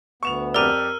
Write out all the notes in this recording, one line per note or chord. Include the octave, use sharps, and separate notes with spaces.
D2 B3 C#6 E7 F7
F2 G4 A#4 D5 A#5 E6 F6 D#7